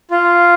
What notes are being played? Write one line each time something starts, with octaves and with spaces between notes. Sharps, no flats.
F4